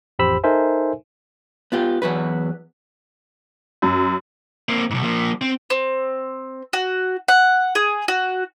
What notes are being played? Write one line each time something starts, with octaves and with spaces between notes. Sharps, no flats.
A1 F2 G4 C5 B5 E6
D#4 A4 A#4 C5 E5 G#5
B3 F4 G4
E2 F#3 F#4 B4
F#2
A#3 C4
B1 G#2
F3 A#3
C4
C4
F#4
F#5
G#4
F#4